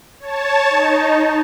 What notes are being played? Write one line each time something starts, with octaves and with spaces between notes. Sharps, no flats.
C#5 A5
D#4